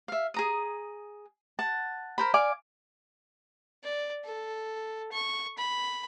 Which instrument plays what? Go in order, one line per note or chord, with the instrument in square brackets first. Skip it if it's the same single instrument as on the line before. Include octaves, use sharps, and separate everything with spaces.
[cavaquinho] E5 F5
G#4 A#5 D#6
F#5 A5
A#4 C5 B5
D5 F5 G#5 D6
[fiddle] D5
A4
C#6
B5